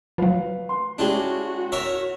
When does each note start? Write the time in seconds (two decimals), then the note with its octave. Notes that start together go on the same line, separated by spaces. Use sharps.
0.18 F3 F#3 B4 F5
0.69 C6
0.98 G#3 C#4 D4 E4 F#4 G4
1.72 A#4 C#5 E5